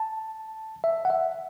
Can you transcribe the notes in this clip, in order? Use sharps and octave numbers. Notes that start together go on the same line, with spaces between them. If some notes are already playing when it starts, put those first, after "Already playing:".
Already playing: A5
E5
F#5
E5